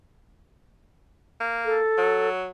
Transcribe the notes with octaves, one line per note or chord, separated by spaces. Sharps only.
A#3
A4
F#3